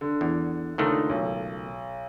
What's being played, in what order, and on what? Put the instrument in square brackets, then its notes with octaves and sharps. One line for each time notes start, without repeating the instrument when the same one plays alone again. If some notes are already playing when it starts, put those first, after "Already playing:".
[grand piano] D3
[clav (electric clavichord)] E2
[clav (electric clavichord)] C#2 D#3 A3 [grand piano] D3 D#4
[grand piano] B1